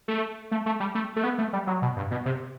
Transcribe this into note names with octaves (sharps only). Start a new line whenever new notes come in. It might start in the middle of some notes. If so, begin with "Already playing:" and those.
A3
A3
A3
G3
A3
A3
B3
A3
G3
F#3
B2
G2
B2
C3